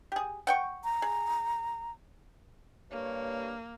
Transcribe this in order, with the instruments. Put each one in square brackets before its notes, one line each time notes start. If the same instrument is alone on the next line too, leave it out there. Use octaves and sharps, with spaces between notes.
[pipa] G4 G#4
F#5 G5 C#6
[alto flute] A#5
[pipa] G#4
[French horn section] G2 C#5 [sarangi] A#3